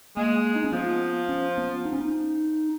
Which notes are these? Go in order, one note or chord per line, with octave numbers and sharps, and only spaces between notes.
G#3 A#3
D#4
C#4
F3 B3
C#4
B3
D#4
C#4
D#4